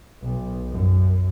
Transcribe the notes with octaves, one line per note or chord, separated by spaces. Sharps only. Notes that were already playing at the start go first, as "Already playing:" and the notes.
B1
F#2